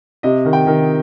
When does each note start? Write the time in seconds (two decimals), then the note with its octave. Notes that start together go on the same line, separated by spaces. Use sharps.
0.23 C3 D#5
0.45 D#3
0.53 G5
0.67 D#3